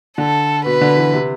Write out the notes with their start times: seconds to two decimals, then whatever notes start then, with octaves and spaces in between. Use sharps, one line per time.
0.18 D3 A4
0.65 B2 B4
0.81 D3
0.97 E3
1.13 C3